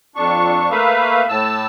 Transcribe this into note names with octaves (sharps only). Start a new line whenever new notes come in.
F2 D4 C#6
A3 A#3 B4 E5 F5
A2 A5 E6